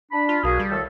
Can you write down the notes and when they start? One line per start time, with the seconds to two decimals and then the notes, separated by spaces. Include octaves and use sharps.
0.12 D4 B5
0.29 F4
0.44 B1 A#3 F#4 G#4
0.59 G3
0.71 A2 D#3 A4